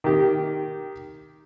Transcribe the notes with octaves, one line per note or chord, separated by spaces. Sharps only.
D#3 G4